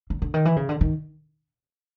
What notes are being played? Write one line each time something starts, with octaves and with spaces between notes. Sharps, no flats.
D3
D3
D#3
E3
C#3
D3
D#3